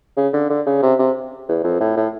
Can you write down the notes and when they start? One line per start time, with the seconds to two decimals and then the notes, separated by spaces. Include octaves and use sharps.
0.17 C#3
0.33 D3
0.50 D3
0.66 C#3
0.82 C3
0.99 C3
1.48 E2
1.64 F2
1.80 A2
1.96 A2